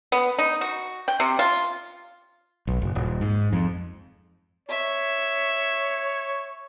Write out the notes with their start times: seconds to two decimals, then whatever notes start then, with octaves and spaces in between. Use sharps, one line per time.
0.12 B3
0.39 D#4
0.61 F#4
1.08 G5
1.20 C3
1.39 F4
2.67 B1
2.82 F#1
2.95 D#1
3.21 G#2
3.53 F2
4.69 C#5 E5